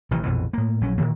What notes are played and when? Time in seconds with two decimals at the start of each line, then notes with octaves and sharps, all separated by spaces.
0.11 A1 C3 D#3 E3
0.24 A#1 F2 B2 E3
0.53 A2 A#3
0.81 A#1 F#3 C#4
0.98 A#2 D#3 E3 A#3